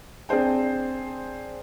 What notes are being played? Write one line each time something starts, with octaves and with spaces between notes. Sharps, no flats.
C4 D4 G#4 C5 G5